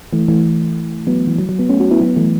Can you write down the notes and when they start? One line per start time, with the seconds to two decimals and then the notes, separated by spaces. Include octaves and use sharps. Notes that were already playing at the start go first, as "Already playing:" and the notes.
0.13 E3 A3
0.28 E3 A3
1.07 F#3 B3
1.27 E3
1.38 F#3
1.49 F#3
1.59 F#3 B3
1.69 A3 C#4
1.80 C#4 F#4
1.91 B3 E4
2.01 F#3 B3
2.16 E3 A3